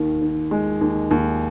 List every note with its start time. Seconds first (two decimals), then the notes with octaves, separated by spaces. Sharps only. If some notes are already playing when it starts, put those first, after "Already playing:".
Already playing: D#2 D#3
0.22 D#3
0.51 G#3
0.81 D#2
1.11 D#2